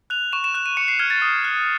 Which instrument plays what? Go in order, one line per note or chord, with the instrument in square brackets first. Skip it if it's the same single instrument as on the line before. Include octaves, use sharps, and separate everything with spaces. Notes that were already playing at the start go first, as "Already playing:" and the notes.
[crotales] F#6 F7
C#6 E7
E7
F#6 E7
D#7
C#6 C#7
C7
F6 G#6
A6
D#6
F#6